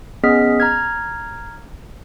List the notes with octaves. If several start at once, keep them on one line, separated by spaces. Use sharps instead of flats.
B3 C#4 G#4 D#5 F6 B6
A#5 F6 G#6